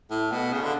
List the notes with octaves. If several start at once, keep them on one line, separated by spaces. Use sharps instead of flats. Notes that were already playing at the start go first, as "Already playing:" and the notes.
A2
B2
C#3
D3